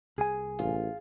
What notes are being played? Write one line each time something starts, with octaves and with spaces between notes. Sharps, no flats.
C2 G#4 G#5
A1 F4